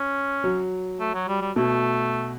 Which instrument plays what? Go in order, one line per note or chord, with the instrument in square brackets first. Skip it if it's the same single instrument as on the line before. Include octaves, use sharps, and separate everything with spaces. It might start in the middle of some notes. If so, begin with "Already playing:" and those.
Already playing: [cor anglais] C#4
[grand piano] F#3
[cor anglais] A3
F#3
G3
G3
[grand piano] B2 [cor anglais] A3